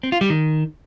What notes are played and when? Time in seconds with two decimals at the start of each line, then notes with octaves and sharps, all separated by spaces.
0.03 C4
0.12 F4
0.21 G3
0.30 D#3